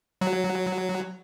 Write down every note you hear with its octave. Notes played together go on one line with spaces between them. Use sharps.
F#3